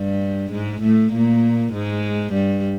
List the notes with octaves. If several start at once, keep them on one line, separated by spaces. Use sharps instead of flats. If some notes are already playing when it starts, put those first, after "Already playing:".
Already playing: G2 G3
G#2 G#3
A2 A3
A#2 A#3
G#2 G#3
G2 G3